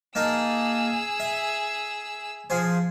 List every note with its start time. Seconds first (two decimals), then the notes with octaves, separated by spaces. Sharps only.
0.15 A#3 D#4 G#4 A5 E6
1.20 E5
2.50 F3 G#4 C5